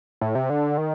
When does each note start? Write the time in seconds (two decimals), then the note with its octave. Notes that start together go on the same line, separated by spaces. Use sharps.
0.21 A2
0.35 C3
0.50 D3
0.78 D#3